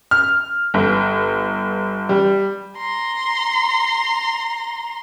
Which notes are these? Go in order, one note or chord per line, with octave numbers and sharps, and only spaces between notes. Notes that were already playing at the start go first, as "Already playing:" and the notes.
F6
G1
G3
A#5 C6